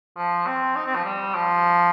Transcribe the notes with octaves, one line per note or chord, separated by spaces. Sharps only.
F3
C4
D#4
C4
F3
G3
F3